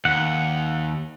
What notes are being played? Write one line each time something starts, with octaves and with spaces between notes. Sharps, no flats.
D#2 F#5